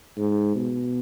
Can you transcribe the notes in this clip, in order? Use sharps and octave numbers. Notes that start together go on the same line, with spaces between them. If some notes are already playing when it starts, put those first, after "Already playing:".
G#2
B2